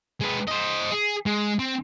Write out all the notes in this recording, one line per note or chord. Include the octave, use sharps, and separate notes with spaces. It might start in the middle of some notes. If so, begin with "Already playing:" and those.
G#3 B4
C5 D#5
G#4
G#3
C4